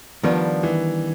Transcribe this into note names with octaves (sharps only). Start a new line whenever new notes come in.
D#3 F3 G3 B3 D4
E3